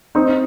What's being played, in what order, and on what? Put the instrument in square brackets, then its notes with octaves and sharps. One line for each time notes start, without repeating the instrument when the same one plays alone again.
[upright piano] C4 D#4